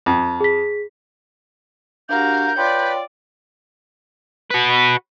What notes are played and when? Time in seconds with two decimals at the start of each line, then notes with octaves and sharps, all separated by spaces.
0.06 F2
0.40 G#4 B6
2.09 D4 F#4 G4 A#4 F5 G6
2.56 F4 B4 C#5 D5 G5 C6
4.50 F#4 B4